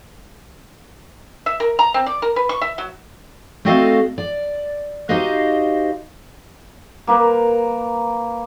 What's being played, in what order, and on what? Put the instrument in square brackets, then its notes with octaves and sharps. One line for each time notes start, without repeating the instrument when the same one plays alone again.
[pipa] E5
A#4
A#5
C4
D5
A#4
B4
C#6
E5
F#3
[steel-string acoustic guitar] A3 C4 F#4 A4 D#5 F5
D5
D#4 F#4 G4 C5 D#5 F5
[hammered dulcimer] A#3 A#4 B4